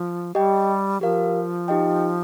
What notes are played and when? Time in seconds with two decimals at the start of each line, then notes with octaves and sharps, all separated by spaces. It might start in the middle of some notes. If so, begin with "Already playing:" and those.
Already playing: F3
0.35 G3 G4 D#5 G5
1.01 F3 G4 A#4 F5
1.68 D#4 G4 D#5 G5